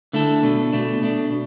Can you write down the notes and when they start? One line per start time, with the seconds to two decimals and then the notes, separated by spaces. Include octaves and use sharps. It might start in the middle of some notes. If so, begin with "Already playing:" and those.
0.13 D3 A3 E4 A4
0.43 B2 A3 D4
0.73 B2 A3 D4
1.01 B2 A3 D4
1.30 B2